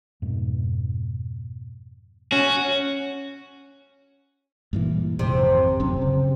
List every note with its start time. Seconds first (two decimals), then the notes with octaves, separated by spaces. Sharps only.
0.22 F2 G#2 B2
2.32 C#4 F#4
4.73 G2 A#2 E3
5.19 G#1 F2 C3
5.80 D1 F#2 C#4
6.02 C#3